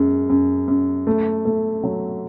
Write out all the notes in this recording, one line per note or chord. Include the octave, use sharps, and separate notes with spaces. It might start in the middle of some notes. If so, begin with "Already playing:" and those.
Already playing: F#2 G#3
F#2
F#2
A3
A3
F#3